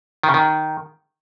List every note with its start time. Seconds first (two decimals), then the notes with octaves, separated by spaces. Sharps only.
0.23 D#3
0.29 C#3
0.34 D#3